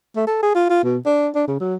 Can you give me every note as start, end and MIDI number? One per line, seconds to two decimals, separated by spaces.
0.16 0.25 57
0.27 0.41 69
0.43 0.53 68
0.55 0.65 65
0.69 0.82 65
0.83 0.98 47
1.06 1.28 62
1.35 1.44 62
1.47 1.59 49
1.60 1.75 54